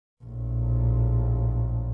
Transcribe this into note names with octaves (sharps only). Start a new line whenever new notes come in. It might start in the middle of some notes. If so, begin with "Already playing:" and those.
A#1 A2